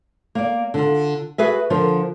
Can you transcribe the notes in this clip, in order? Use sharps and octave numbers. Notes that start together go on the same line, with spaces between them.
A#3 D5
D3 F4
F#4 G#4 B4 E5
D3 F3 F4 A#4